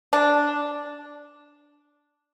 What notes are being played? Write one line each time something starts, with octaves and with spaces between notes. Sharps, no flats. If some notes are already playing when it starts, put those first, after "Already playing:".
D4